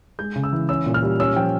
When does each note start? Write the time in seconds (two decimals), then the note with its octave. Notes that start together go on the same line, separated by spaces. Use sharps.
0.19 G#3 G6
0.36 C#3
0.44 E6
0.53 E3
0.69 C#4 E6
0.86 A#2
0.94 F6
1.03 G3
1.20 C#4 E6
1.36 F3 G5